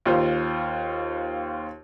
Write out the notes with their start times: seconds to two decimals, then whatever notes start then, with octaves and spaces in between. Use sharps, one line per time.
0.06 D#2 F4 C5